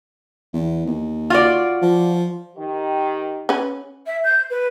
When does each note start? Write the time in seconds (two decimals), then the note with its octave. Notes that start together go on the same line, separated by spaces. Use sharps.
0.54 E2
0.86 D#2
1.30 F4 F#4 D5
1.82 F3
2.56 D#3 G4
3.49 C#4 B4
4.06 E5
4.24 G6
4.50 B4